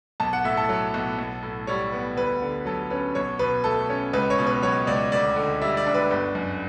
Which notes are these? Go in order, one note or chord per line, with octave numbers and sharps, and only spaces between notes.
B1 A5
F#5
A2 E5
A4
F#3
B1
B1
A2
G3 C#5
B3
D2 B4
D3
F#3 A4
C#4 B4
B1 C#5
B2 B4
A3 A4
C#4
C#2 B4
C#5
B2
B4
F#3 C#5
C#2 D5
D2 D5
D3
G3 E5
D5
D4
B4
G1
F#2